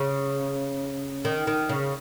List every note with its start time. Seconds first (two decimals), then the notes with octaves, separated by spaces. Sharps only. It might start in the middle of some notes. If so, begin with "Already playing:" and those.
Already playing: C#3
1.25 D#3
1.47 D#3
1.69 C#3